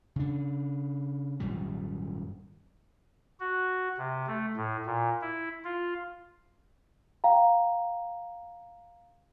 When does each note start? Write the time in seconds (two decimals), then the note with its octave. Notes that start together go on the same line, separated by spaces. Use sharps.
0.16 C#3 D4
1.40 G#1 F#2 A#2 G3
3.40 F#4
3.97 C3
4.27 A3
4.57 A2
4.86 A#2
5.21 E4
5.65 F4
7.24 F5 G5 A#5